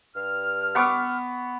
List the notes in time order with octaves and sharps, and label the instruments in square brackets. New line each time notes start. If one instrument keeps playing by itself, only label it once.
[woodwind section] G2 F6
[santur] B3 C#6 D6